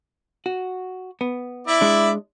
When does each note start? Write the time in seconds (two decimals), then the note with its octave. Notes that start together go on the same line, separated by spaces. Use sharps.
0.46 F#4
1.21 B3
1.67 E4 D5 E5
1.81 G#3 D4